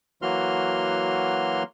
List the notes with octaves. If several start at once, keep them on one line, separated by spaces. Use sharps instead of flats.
E3 F#3 A#3 F#4 C6 F6